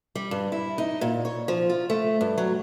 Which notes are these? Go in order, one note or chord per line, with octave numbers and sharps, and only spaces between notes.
G3
G2
E4
D#4
A#2
C#5
F3
F4
A3
G2
F#3